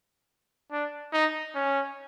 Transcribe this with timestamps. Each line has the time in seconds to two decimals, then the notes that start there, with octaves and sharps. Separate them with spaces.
0.72 D4
1.13 D#4
1.55 C#4